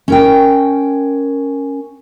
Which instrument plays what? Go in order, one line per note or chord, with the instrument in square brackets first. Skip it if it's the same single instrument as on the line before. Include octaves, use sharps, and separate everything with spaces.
[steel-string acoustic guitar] C#4 A#4 G5